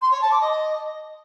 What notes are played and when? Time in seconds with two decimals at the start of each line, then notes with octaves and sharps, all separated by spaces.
0.02 C6
0.11 C#5
0.21 A5
0.31 D6
0.41 D#5